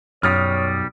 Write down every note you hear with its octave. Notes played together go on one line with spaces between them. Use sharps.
B1 F#2 G3 C#5 D#6 F6